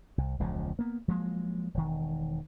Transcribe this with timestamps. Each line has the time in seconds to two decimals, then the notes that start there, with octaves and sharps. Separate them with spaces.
0.18 C2
0.40 E1 C#2 C#3 F3
0.79 A#3 B3
1.08 F3 F#3 G#3 A#3
1.74 E1 D#3